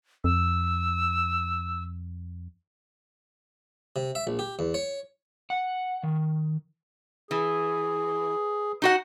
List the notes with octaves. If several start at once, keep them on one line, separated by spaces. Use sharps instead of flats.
F2 E6
C3
E5
A#1
G4
E2
C#5
F#5
D#3
E3 G#4
D#4 F#4 F#5